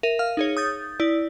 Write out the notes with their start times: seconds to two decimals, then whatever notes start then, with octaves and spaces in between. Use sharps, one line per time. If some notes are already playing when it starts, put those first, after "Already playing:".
0.03 A#4 E5 D#7
0.19 F5 F6
0.37 D#4 G#4 C#5
0.57 D#6 G6 A6
1.00 E4 D5